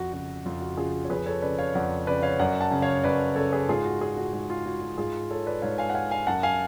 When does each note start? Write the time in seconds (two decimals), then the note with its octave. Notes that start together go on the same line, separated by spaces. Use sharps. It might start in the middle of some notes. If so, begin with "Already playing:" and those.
Already playing: F2 F#4
0.12 C#3 F#4
0.46 F2 F4
0.61 F#4
0.77 C#3 F4 G#4
1.05 C#5
1.09 F2 G#4 B4
1.26 A4 C#5
1.42 C#3 B4 D5
1.58 C#5 F5
1.74 F2 D5 F#5
2.07 C#3 B4 D5
2.23 C#5 F5
2.39 F#2 D5 F#5
2.61 F#5 A5
2.71 C#3
2.82 C#5 F5
3.03 F#2 B4 D5
3.36 C#3 A4 C#5
3.52 G#4 B4
3.68 G#2 F4 G#4
3.85 F#4
4.01 F4 G#4
4.12 F4
4.17 F#4
4.33 G#2 F#4
4.50 F4
4.66 F#4
4.82 F#4
4.98 G#2 F4 G#4
5.30 A4 C#5
5.46 B4 D5
5.62 G#2 C#5 F5
5.78 F5 G#5
5.90 F#5
5.94 F5 G#5
6.11 F5 G#5
6.27 F#2 F#5 A5
6.43 F5 G#5